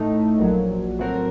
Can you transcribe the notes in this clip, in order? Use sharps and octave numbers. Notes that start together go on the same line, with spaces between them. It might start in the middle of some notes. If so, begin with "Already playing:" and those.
Already playing: A2 A3 D#4
A#1 A#2 F#3
A2 F#3 C4 F#4 A#4